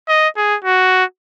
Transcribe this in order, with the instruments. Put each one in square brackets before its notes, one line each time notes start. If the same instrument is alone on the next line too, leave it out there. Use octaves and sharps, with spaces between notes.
[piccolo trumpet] D#5
G#4
F#4